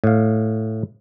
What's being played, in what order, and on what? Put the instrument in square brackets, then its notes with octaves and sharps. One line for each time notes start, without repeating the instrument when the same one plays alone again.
[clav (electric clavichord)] A2 F5